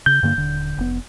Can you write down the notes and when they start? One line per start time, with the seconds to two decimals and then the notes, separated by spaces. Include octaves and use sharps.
0.06 C#3 G6
0.23 G2 D3 A#3
0.37 D#1 D3
0.78 F1 B3